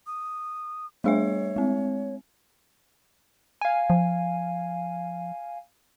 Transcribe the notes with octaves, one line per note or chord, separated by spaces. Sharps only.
D#6
G3 A3 D4 G#4 C#5 E5 F5
G#3 C4
F5 G#5
F3